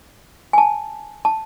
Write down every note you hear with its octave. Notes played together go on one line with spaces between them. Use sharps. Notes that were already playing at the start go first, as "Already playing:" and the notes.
G#5
A5
A5